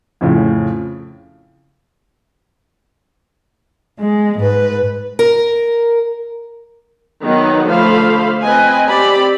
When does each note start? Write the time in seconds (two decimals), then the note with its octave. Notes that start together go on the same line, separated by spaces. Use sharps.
0.21 F2 A2 C#3
3.99 G#3
4.38 G#2 B4
5.19 A#4
7.22 D#3 F#3 B3 D#4
7.68 D3 F3 A3 C5 F5 B5
8.43 C4 B4 D#5 G#5
8.88 C4 G4 D5 B5